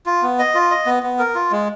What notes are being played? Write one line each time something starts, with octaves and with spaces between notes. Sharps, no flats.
F4
B3
D#5
F4
D#5
B3
B3
A#4
F4
G#3